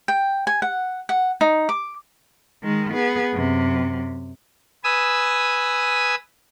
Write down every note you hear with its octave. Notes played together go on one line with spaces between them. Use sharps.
G5
G#5
F#5
F#5
D#4
D6
D#3 G#3
B3 G#4
F#2 C3
B4 G#5 D#6 E6